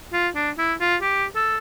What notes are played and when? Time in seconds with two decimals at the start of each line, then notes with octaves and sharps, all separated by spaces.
0.13 F4
0.35 D4
0.58 E4
0.80 F4
1.02 G4
1.36 A4